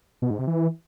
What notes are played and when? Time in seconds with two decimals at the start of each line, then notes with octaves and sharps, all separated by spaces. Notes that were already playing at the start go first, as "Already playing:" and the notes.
0.22 B2
0.30 G#2
0.39 C3
0.47 E3